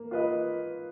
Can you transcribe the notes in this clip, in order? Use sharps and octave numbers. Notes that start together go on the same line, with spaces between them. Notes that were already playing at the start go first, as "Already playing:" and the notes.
Already playing: A#3
F4 B4 D#5